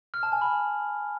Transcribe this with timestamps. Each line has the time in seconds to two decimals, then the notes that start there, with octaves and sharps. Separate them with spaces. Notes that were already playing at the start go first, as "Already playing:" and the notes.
0.14 F6
0.23 A5
0.32 G#5
0.41 B5